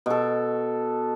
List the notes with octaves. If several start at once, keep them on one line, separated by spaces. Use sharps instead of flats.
B2 A4